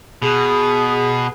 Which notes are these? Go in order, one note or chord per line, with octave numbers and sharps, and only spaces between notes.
B2 G#4